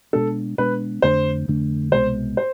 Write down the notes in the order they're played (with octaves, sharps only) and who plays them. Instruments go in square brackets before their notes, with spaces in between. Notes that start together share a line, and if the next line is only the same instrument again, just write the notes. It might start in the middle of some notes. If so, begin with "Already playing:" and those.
[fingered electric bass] B2 G#3 B3 D4 [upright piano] A4
[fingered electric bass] B2 G#3 B3 D4 [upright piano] B4
[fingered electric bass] F2 D3 A3 D4 [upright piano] C5
[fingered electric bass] F2 D3 A3 D4
[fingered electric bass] C2 B2 G#3 [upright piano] C5
[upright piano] C5